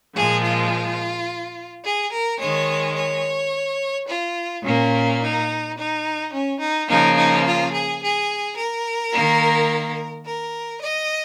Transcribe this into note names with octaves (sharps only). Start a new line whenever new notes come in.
A#2 F3 G#3 G#4
F4
G#4
A#4
D#3 G#3 C#5
C#5
F4
A#2 A#3 C#4
D#4
D#4
C#4
D#4
C#3 F3 A#3 D#4
D#4
F4
G#4
G#4
A#4
D#3 A#3
A#4
D#5